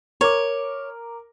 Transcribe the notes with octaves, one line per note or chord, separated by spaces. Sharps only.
A#4 C#5 D6